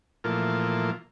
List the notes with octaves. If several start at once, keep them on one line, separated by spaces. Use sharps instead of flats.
A#2 E3 F3 A3 A#3 F4